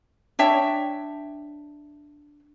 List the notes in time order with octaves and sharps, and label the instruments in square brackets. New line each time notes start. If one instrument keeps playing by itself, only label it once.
[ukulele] D4 C#5 E5 G5